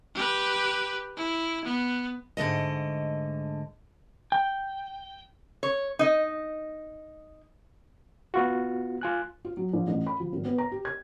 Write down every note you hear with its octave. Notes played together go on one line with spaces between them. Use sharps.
G4 B4
E4
B3
G#2 D3 A3 D#5
G5
C#5
D#4 D#5
B3 F4 F#4
F4 G#5 F#6
F4
F#3
A#1
A1
B5
F3
G#1
B3
A#5
G4
G#6